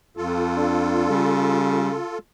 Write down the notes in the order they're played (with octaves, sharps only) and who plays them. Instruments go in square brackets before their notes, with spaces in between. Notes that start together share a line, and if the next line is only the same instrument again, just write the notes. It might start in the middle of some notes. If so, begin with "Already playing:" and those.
[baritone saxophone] F2 [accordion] F4 A4
[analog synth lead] D4
[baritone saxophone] C#3 [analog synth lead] G3